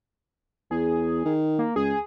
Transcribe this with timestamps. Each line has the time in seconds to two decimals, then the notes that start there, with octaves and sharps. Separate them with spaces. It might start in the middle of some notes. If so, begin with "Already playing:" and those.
0.71 E2 G#4
1.25 D#3
1.59 A#3
1.76 C#2 G#4